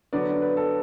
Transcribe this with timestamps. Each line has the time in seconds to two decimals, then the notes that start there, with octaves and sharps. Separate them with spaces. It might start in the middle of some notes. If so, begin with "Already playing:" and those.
0.13 D3 F#3 B3 D4 D5
0.28 D5
0.42 B4
0.57 A4